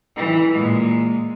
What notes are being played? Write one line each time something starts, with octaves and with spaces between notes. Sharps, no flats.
E3
A#2 G#3